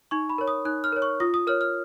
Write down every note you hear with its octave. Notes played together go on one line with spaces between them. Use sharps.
D#4 C#6
B5
A#4 C#5
D#6
D#4 F#6
F6
A#4 C#5
C#6
F4 D#6
D#6
A#4 C#5 F6
F6